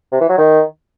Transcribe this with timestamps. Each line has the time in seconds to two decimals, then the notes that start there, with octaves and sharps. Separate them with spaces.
0.12 C3
0.21 E3
0.29 F#3
0.38 D#3